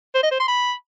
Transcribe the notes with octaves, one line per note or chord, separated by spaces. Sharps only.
C5
D#5
C5
C6
B5